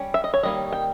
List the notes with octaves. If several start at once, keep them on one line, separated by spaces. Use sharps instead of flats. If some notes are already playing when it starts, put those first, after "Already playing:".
Already playing: G3 C#4
E5
D#5
C#5
D#3 G3 A#3 D#4 D#5
G5